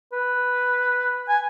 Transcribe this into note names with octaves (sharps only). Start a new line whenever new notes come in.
B4
G#5